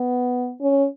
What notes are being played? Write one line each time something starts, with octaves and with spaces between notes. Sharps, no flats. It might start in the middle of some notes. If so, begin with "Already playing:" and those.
Already playing: B3
C#4